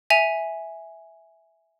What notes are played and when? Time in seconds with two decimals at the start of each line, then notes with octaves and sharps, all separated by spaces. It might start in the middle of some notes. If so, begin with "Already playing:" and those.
0.10 E5 G#5 F7